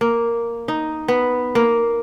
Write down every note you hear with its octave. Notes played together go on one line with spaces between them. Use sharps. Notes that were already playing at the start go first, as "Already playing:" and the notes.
A#3
D#4
B3
A#3